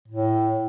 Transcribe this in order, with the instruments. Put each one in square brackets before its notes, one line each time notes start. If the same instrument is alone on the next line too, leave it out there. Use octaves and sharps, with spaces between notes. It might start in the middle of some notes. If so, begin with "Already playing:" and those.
[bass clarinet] A2